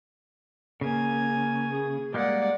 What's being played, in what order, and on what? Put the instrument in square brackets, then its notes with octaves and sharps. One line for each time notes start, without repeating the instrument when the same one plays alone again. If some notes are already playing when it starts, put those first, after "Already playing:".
[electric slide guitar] C#3 [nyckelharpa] A#3 G#5
[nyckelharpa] G#4
[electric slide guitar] G3 G#3 A#3 [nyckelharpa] D5 F#5